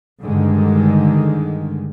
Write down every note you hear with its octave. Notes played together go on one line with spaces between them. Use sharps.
G2 D3 D#3 G#3